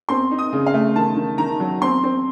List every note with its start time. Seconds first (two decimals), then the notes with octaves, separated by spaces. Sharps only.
0.09 C4 C6
0.31 D#4
0.39 D#6
0.53 C#3
0.66 F5
0.74 A3
0.96 D#3 A5
1.16 D#3
1.38 D#3 A#5
1.60 F#3
1.81 C4 C6
2.04 C4